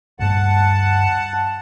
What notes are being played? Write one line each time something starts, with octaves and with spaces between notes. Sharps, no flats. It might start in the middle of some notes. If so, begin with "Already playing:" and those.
D2 G2 A3 F#5 A5